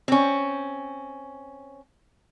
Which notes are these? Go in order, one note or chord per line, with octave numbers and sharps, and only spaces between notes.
C4 C#4